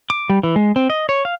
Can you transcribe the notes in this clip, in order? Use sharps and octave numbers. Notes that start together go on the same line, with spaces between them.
D6
G3
E3
G#3
C4
D#5
C#5
F5